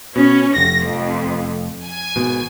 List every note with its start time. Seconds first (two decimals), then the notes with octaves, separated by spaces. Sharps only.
0.16 B2 C#4
0.56 F1 A#6
0.86 F2
1.84 G#5
2.16 G#1 B2